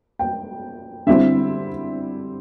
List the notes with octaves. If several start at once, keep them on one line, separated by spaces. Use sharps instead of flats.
G5
D3 G3 C4 E4 E5